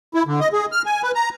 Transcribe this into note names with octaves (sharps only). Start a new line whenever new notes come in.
E4
D3
D#5
G#4
F6
G#5
B4
A#5